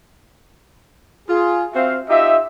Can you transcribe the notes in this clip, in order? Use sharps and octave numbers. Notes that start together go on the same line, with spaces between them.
F4 G#4
C4 F#4 C5 E5 F5
D#4 F4 G4 D#5 E5